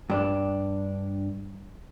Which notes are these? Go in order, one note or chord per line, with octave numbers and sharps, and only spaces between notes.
G2 D4